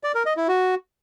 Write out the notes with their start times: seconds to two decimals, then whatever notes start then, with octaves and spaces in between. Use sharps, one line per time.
0.04 D5
0.15 A#4
0.26 D#5
0.37 E4
0.48 F#4